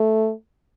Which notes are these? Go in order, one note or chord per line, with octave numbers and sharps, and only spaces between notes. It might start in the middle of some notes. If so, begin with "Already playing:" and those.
Already playing: A3